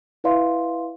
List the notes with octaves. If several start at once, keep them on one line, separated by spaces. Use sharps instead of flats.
E4 B4 D5 E5 F5 C6